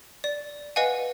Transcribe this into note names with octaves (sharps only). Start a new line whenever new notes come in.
D5
B4 D#5 F5 F#5 G#5